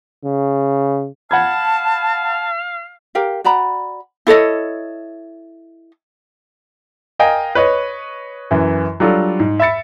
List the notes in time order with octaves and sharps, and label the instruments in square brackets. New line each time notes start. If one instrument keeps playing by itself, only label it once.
[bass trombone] C#3
[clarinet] F5 [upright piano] F#5 B5 G#6 [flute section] A5
[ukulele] G4 A#4 F5
F#4 D5 A#5 B5
E4 A4 C#5 D#5
[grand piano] A#4 D#5 F5 G5 G#5
B4 C#5 D#5
F#2 E3
F#3 G3 D4 F4 A4
G#2
E5 B5 A6 C#7